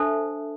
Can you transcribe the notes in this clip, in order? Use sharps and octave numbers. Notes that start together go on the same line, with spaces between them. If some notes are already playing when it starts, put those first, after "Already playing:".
Already playing: D4 A4 C5 E5 A5